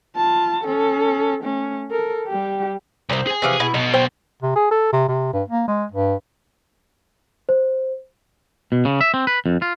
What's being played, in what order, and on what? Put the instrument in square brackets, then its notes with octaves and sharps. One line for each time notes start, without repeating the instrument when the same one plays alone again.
[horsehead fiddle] F4 A5
C#4 A4
A3 C#4
A4 A#4
G3 G4
[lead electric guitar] C2 [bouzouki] C4 C#4
[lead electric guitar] G#4 G#5
[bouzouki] C3 E3 F3
B2 E4
[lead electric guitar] B1 B2 [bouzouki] D#4
[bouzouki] C5 G5
[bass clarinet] C3
G#4
A4
C3
C3
G2
A#3
G#3
G2
[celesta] C5
[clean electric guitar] B2
C#3
E5
C4
B4
F2
F4